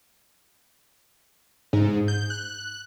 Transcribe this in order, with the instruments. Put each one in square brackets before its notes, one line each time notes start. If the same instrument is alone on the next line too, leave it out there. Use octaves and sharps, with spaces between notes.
[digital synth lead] G#2
G6
F#6